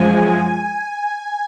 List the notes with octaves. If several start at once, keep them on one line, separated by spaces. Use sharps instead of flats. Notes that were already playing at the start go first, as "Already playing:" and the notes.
Already playing: F#2 F3 G#3 G#5